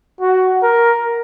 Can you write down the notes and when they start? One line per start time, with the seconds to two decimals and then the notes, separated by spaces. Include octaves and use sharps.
0.21 F#4
0.63 A#4